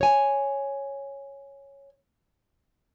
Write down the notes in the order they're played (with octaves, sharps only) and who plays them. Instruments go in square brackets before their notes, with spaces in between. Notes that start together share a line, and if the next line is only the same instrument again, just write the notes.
[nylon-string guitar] C#5 G#5